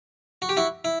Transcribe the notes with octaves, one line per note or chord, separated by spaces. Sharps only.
F#4
G4
E4 F#4
E4